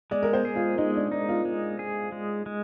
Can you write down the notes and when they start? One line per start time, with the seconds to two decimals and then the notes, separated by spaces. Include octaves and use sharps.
0.11 G#3 D5
0.23 A#4
0.33 C5
0.45 G#4
0.56 F4
0.78 G#3 D#4
0.96 D4
1.12 D4 D#4
1.29 F4
1.45 G#3
1.79 G#4
2.12 G#3
2.46 G#3